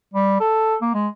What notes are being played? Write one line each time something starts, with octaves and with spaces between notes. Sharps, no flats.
G3
A4
A#3
G#3